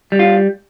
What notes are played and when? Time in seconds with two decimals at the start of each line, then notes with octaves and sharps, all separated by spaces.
0.12 G3
0.19 F4